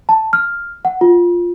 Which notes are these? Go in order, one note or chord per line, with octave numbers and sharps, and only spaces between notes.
A5
F6
F#5
F4